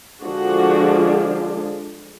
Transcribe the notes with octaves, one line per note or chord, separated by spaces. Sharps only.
D3 F3 G#3 D4 F#4